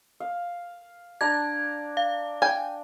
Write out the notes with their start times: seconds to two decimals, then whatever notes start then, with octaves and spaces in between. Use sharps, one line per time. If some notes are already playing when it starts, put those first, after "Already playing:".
0.20 F5
1.21 D4 D5 A#5 G#6
1.97 F5
2.42 G5 G#5